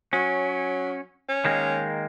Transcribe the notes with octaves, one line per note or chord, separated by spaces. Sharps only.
F#3 C#4
C#4
D#3 G#3 A#3